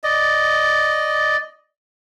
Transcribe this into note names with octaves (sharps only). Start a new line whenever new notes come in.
D5 D#5